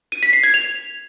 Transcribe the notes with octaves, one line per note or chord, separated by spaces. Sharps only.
D#7
B6
C7
G#6
F7